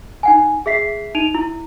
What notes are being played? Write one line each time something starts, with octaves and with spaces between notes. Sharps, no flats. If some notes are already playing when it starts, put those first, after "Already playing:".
D#4 F#5 G#5
G#4 E5 B6 C7
D#4 D7 D#7 F7
E4